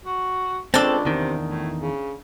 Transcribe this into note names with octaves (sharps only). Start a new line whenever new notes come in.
F#4
C#2 C4 D4 A4 A5
E2 C3 D#3
A2
C#3